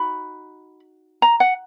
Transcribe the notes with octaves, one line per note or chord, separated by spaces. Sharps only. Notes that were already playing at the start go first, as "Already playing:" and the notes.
Already playing: D#4 F#4 B5
A#5
F#5